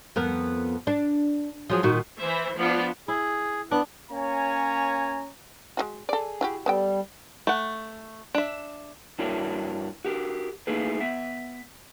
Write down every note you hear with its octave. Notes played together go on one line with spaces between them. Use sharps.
F2 B3 A#4
D4
F3 F#3 G#4
A#2 D#3 F#4
E3 C5 E5
F3 B3 D4 F4 D5
E4 G#4
B3 D4 F#6
A#3 C#4 C#5 G#5 A#5
G#3 F4 F#4
G#4 A4 D5
E4 F#4 G4
G3 B3 A4 G5
A3 F#5
D4 E5
G2 D4 E4 F#4 A#4 C#5
F#4 G4 A#4
A3 A#3 D#4 E4 G#4 B4
B3 E5